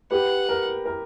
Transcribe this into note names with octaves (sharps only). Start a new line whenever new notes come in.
G4 B4 F#5
A#4
A#4